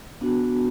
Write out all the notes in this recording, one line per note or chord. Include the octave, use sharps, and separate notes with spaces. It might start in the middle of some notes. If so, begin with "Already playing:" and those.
B3 D4 F#4